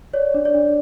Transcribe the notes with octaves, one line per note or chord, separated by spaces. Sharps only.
C#5 D5
D4
D5
D4